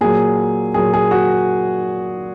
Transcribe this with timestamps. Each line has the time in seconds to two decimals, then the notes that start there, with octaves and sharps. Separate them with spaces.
0.01 A#2 F#3 G#4
0.74 A#2 F#3 G#4
0.94 G#4
1.11 F#4